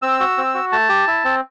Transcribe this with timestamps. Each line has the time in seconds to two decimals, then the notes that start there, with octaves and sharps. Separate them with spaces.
0.02 C4 E6
0.20 F#4
0.38 C4
0.54 F#4
0.72 A3 A5
0.89 G4
1.07 E4
1.24 C4